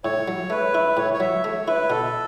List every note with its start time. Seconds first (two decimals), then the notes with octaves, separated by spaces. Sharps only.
0.04 A2 C#5
0.28 F#3
0.50 A3 B4
0.75 E4
0.97 A2 C#5
1.14 C#5
1.20 F#3 E5
1.44 A3 C#5
1.68 E4 B4
1.90 B2 A4